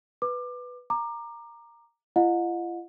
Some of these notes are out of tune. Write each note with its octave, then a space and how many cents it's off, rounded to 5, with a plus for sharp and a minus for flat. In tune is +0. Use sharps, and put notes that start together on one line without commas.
B4 +0 D6 +25
A#5 +0 D6 +25
F4 -45 D#5 +0 F#5 -40